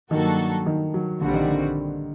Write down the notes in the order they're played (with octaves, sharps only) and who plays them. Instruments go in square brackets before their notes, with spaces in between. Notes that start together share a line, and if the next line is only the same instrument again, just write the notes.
[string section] G2 F#3 A#3 F#4 A4 [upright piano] D#3
[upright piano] D#3
F#3
[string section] A#1 A#2 G3 C4 F#4 [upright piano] D3
[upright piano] D#3
D3